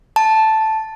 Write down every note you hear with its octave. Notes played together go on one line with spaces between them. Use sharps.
A5